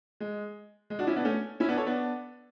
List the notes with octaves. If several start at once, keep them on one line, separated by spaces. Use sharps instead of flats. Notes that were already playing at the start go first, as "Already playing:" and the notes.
G#3
G#3
D4 F#4
C#4 E4
B3 D4
A3 C#4
C#4 E4
B3 D4
A4 C#5
B3 D4